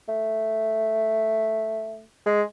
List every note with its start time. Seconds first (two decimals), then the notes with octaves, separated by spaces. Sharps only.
0.08 A3
2.26 G#3